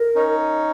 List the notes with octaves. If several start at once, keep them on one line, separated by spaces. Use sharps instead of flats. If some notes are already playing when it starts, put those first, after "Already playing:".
Already playing: A#4
C#4 D#4